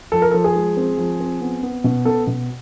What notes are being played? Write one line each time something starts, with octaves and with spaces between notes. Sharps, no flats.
F3 A4
A#4
F3 A4
G#4
G#3
C4
F3
C4
B3
B3
B2
B3 A4
B2